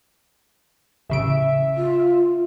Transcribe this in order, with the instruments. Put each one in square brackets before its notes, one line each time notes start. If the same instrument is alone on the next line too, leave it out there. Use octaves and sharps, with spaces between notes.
[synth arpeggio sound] A1 C#3 D7 [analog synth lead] E5
[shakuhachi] F4